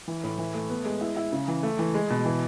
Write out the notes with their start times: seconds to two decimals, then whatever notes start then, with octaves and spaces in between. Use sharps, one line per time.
0.08 E3
0.24 A2
0.38 E3
0.54 A3
0.70 B3
0.85 G#3
1.01 E4
1.17 E4
1.33 C#3
1.48 E3
1.63 A3
1.79 E3
1.94 G#3
2.10 B2
2.25 E3